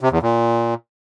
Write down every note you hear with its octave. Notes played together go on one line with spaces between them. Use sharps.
C3
E2
A#2